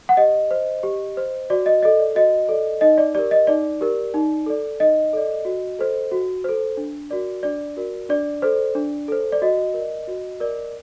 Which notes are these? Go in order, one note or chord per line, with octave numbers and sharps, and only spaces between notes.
F#5
G4 D#5
C5
G4
C5
F#4 D5
D#5
A4 D5 D#5
D5
F#4 D#5
A4 D5
D#4 D#5
D5
G4 A#4 D5
D#5
D#4 D5
G4 A#4
D#4
A4 D5
D#4 D#5
A4 D5
F#4
A4 C5
F#4
A4 C5
D4
F#4 A#4 D5
D4 D5
F#4 A#4 D5
D4 D5
A4 C5
D4
A4 C5
D5
F#4 D#5
A#4
D5
F#4
A#4 D5